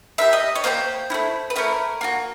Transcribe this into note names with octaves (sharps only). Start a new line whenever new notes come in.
A#3 D#4 G4 E5
D#5
C#5
A#3 D#4 G4 C5
A3 C#4 E4
B4
A3 C#4 E4 A#4
A#3 D4 F#4